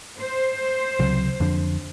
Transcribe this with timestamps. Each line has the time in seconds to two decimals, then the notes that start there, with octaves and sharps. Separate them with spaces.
0.19 C5
0.99 C#2 C3 F#3
1.40 F2 D3